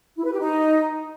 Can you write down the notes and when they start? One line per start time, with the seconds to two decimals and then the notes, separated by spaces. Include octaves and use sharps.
0.17 E4
0.24 B4
0.32 G4
0.40 D#4